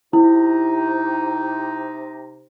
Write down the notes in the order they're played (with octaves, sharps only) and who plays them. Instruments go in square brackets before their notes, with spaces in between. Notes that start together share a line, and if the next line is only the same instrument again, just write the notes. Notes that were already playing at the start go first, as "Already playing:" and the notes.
[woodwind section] C3 D#4 [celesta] E4